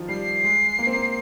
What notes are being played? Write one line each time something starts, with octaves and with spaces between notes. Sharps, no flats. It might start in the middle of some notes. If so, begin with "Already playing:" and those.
Already playing: D#3 F3
G3 C7
G#3
A#3
C4
A#3